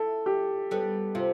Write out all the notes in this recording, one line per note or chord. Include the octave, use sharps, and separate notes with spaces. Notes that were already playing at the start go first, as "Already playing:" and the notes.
Already playing: E4 A4
G4
G3 B3 A4
C3 F4